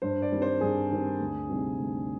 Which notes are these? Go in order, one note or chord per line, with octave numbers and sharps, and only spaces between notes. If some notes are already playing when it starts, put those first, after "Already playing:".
G2 C5
D5
D#3 G3 C4
C5
G2 G#4
D#3 G3 C4
D2
C3 G3 C4 D#4
D2